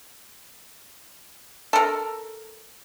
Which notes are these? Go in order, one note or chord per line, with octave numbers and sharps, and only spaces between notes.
A4 A#4